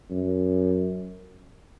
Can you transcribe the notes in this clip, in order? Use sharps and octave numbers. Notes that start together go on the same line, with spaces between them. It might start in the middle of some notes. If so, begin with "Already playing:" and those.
F#2